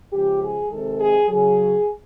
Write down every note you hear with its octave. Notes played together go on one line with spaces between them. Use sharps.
C#3 F3 G#3 G4
G#4
C3 D#3 G#3 A4
G#4
C#3 F#3 G#4